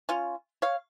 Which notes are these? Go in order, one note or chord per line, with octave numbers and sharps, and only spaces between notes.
C#4 F4
C#5 F5